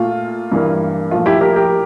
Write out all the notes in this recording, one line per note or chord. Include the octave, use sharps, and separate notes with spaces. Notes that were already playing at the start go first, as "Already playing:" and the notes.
Already playing: A#2 A3 F4
G2 E3 G3 A#3
A#2 F3 A3 F4
E4 G4
G4 A#4
G4 A#4